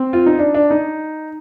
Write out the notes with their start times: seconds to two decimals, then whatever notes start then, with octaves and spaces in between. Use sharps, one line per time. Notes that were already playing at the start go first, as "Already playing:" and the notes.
Already playing: C4
0.13 F4
0.26 D#4
0.39 D4
0.54 D4
0.70 D#4